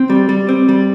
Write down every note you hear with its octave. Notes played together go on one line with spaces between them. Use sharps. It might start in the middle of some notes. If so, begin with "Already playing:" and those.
Already playing: C4
G3
G3
C4
G3